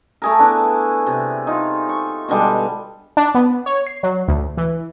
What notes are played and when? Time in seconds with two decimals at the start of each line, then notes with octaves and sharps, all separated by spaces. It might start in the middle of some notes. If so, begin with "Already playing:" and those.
0.22 A3 G#4 A#4
0.39 B3 D4 E4
1.06 C3
1.47 D#4 F4
1.89 C#6
2.28 B2 D3 G3 G#3
3.17 D4
3.35 B3
3.66 C#5
3.87 C7
4.03 F#3
4.28 D2
4.57 E3